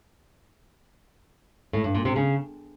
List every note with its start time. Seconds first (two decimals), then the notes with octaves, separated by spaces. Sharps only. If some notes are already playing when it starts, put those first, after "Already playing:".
1.73 A2
1.84 G2
1.95 A#2
2.05 C3
2.16 C#3